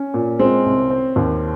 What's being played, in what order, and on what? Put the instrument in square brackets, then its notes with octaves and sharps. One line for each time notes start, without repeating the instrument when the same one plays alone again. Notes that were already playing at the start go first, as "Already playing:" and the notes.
Already playing: [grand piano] C#4
[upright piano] A#2
[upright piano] G#3 [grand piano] C4
[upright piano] C2
C4
D#2